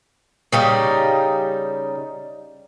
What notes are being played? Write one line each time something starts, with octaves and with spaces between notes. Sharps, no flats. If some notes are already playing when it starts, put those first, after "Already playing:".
C#3 G3 D#4